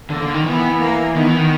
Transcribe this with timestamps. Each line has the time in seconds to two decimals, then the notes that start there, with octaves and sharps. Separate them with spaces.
0.10 D3 A#3
0.22 D3
0.34 D#3
0.45 E3 B3
0.81 A#3
1.15 D#3 B3
1.27 E3
1.38 D#3